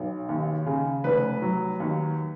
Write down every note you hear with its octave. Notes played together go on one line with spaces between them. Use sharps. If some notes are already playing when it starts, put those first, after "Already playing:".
Already playing: B1
D#2
C#3
F1 B4
F#3
D#2